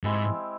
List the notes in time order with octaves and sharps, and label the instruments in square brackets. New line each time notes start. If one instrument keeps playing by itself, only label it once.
[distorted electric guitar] G#2 [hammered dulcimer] G#3 C4 E4 G4